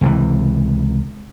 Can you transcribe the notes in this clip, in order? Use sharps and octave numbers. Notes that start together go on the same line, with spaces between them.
C#2 C3 E3